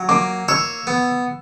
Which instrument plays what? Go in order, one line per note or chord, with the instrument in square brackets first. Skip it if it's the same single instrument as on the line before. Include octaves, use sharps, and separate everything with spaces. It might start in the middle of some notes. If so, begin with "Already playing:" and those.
Already playing: [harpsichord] F#3
[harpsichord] A#3 [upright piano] D6
[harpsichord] C#5 [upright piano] E6
[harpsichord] B3